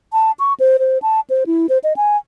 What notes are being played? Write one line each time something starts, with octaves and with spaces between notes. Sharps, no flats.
A5
C#6
C5
C5
A5
C5
E4
C5
D#5
G#5